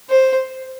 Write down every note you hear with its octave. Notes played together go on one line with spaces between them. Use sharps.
C5